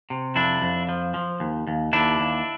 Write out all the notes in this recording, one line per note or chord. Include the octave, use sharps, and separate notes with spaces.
C3
F2 D4 E4
F2
F3
F3
D#2
D#2
D#2 D4 E4
D#2